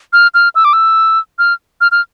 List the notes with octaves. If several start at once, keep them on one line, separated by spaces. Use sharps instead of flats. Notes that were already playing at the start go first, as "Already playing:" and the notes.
F6
F6
E6
D6
E6
F6
F6
F6